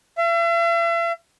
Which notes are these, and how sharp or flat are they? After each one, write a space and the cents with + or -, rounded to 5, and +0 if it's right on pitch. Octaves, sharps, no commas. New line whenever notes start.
E5 +45